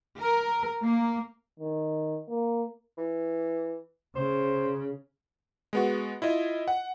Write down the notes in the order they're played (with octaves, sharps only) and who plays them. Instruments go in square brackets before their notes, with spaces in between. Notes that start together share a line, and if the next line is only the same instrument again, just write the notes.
[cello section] A#4
A#3
[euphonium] D#3
A#3
[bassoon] E3
[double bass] C#3 [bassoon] C5
[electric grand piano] G#3 B3 F#4
E4 F4 D#5
F#5